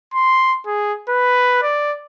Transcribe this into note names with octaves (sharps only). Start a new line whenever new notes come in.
C6
G#4
B4
D5